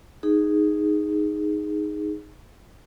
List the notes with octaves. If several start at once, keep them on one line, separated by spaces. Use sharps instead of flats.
D#4 G#4